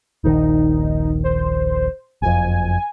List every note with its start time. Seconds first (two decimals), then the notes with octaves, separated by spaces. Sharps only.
0.24 D#1 A#1 D#3 D#4
1.24 C5
2.22 F#1 F2 G#5